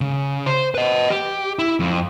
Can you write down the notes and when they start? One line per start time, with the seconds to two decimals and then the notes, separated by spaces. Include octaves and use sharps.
0.01 C#3
0.46 C5
0.75 B4 D#5
1.10 G4
1.59 E4
1.80 F2